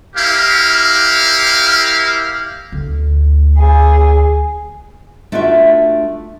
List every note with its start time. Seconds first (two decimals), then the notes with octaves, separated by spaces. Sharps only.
0.16 E4 G4 A#4 F5
2.72 D2
3.57 G#4
5.32 A3 D4 F4 F#4 D5 E5